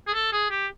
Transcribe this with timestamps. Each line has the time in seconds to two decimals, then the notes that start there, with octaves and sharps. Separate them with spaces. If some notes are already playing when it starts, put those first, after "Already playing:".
0.07 G#4
0.14 A4
0.33 G#4
0.51 G4